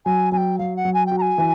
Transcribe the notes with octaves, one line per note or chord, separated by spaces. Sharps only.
F#3 G#5
F#3 G#5
G5
F#3 F5
F#5
F#3
G#5
F#4 G5
A#5
G#5
E3